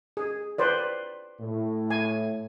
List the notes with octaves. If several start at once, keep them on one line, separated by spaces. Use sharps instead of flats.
G#4
B4 C5 D5
A2
G#5